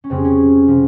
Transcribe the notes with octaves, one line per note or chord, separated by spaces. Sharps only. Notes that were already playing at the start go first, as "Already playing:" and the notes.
C#4
F2 C#3 G3 C4
C#4
C3 F3